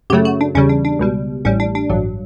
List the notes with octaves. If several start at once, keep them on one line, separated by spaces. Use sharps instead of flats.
F#2 C#3 F#3 A3 G4
F#4
D4
E2 C#3 G3 C#4
D4
D4
C#2 B2 G3
A1 A2 G3 C#4
D4
D4
A1 G2 F#3